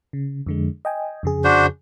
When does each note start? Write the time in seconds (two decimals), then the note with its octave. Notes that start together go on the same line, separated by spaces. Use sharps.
0.13 C#3
0.46 F2 D3 G#3
0.85 D#5 G5 G#5
1.23 F2 C#3 G#4
1.44 D4 F#4 C5